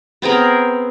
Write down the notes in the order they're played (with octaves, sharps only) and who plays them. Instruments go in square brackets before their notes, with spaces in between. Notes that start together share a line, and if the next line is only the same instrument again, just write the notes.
[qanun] B3 C4 G#4 A#4